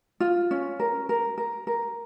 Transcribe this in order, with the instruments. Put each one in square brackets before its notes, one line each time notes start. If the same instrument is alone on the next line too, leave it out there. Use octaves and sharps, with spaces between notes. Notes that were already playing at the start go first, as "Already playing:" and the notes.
[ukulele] F4
C#4
A#4
A#4
A#4
A#4